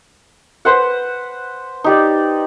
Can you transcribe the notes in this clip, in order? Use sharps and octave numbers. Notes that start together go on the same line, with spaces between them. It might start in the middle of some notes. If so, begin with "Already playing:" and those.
B4 C5 F#5
D#4 G4 D5